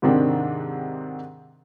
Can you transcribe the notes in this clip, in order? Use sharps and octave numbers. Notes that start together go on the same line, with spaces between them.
G#2 C3 D#3 C4 D4